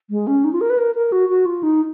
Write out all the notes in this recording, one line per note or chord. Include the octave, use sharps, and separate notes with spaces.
G#3
C#4
D#4
F4
A#4
B4
A#4
A#4
F#4
F#4
F4
D#4